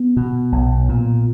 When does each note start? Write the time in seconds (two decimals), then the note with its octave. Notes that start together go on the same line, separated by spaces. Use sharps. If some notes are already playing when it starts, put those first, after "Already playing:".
Already playing: B3
0.17 B2
0.52 B1
0.89 A#2